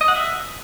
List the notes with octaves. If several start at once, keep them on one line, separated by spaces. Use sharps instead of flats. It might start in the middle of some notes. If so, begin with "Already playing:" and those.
D#5
F#5
E5